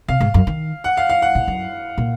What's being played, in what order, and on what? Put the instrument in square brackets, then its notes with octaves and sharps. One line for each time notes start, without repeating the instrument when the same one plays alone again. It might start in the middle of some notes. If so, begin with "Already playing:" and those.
[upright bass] C3 [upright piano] F5
[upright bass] G#2
F#2
D#3
[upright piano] F#5
F5
F5
F#5
[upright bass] A#2
F#2
A#2